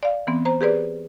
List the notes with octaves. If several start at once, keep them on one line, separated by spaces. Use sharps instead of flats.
D5 F5
E3 B3 C4
C5 A#5
G4 G#4 B4 D5